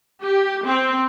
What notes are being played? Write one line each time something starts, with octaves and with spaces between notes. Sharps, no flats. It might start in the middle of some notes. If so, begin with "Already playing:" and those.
G4
C4